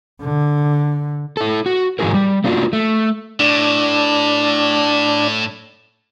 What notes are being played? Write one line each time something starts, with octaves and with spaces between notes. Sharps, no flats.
D3
E4 A4
F#4
G#2 E3 G#3 F#4 G#4 A#4
G3
A3 A#3 D4 F4 F#4
A3
A2 D4